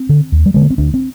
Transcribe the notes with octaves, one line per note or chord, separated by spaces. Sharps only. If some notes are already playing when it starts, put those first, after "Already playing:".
Already playing: C4
D3
D#2
G3
D3 G#3
A#3
C4
D2 D4
C4